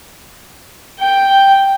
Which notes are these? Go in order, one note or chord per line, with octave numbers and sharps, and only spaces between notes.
G5